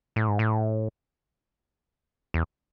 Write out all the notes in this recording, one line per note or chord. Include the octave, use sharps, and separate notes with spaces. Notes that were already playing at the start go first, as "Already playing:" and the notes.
A2
G#2
A2
E2